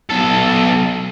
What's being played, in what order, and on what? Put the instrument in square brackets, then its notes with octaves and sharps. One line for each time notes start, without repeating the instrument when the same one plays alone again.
[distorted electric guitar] B1 A4